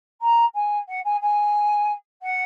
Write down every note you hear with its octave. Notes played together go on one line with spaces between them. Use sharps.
A#5
G#5
F#5
G#5
G#5
F#5